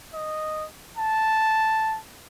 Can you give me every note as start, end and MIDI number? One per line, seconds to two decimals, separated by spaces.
0.14 0.65 75
0.97 1.98 81